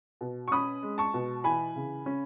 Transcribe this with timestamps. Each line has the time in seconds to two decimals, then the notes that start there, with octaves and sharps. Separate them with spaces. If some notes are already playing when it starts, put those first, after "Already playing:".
0.21 B2
0.48 C#6
0.51 C#4 B5 D#6
0.83 G#3
0.98 A5 C#6
1.14 B2
1.44 E3 G#5 B5
1.76 C#3
2.06 C#4